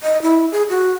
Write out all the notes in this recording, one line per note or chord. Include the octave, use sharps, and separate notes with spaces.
D#5
E4
G#4
F#4